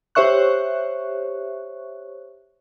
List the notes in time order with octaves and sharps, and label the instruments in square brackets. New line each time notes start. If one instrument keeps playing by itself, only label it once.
[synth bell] G4 C5 C#5 E5 C#6 F#6